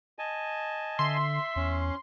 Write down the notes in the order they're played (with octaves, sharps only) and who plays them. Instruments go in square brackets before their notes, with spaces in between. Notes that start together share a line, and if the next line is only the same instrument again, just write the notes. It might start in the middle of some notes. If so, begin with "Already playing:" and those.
[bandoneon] D#5 G#5 A5
[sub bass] D3 [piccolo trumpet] E5 [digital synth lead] C6
[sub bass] E2 [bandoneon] C#4